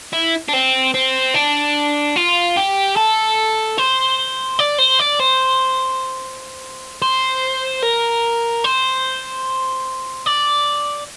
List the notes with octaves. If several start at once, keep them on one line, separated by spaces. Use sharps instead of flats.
E4
D4
C4
C4
D4
F4
G4
A4
C5
D5
C5
D5
C5
C5
A#4
C5
D5